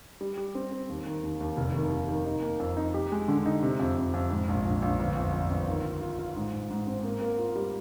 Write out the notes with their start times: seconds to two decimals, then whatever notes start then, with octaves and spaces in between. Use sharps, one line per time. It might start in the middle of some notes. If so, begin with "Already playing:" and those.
0.21 G3
0.37 G4
0.55 C4
0.72 C4
0.89 D#2
1.06 D#3
1.23 D#2
1.40 D#2
1.57 F1
1.74 D#3
1.91 F1
2.08 D#3
2.25 D#4
2.42 A#3
2.60 F2
2.77 D#4
2.94 G4
3.12 G#3
3.28 D3
3.46 D#4
3.63 C3
3.80 F2
3.96 F2
4.14 F2
4.31 G#2
4.48 A#1
4.65 A#1
4.82 A#1
4.99 G1
5.16 F2
5.33 F2
5.50 G1
5.68 D#3
5.84 F4
6.01 F4
6.19 F4
6.36 G#2
6.53 G#2
6.70 G#2
6.87 C4
7.04 A#3
7.22 A#3
7.39 F4
7.55 G3